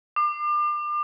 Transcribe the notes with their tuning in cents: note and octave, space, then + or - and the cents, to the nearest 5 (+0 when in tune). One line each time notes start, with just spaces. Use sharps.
D6 +35